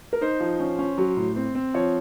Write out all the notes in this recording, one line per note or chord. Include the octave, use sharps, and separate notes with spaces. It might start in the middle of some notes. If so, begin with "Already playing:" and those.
A#4
D#4 C5
F3
C#4
C#4
F#3
A2
C4
C4
F3 C#5